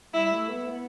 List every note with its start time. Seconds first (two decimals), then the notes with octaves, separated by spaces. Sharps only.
0.14 G3 E4
0.32 A3
0.49 B3
0.67 B3